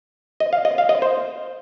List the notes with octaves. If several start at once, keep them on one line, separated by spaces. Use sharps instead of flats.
D#5
F5
D#5
F5
D#5
C5